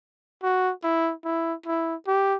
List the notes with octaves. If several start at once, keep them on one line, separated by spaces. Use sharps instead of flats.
F#4
E4
E4
E4
G4